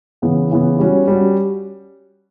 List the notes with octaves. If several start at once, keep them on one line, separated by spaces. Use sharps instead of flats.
C#3 E3 B3
C#3 E3 B3
G3 C#4 F#4
G3 C#4 F#4